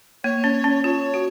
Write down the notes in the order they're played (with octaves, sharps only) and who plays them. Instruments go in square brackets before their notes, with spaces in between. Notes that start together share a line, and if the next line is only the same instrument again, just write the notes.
[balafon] A#3 [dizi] C#5
[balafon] C#4
C#4
[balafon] F4 [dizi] C#5
[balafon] F#4